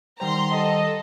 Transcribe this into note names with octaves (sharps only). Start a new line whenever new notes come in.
D#3 G3 C5 F#5 G5 A#5 C6
A4 D#5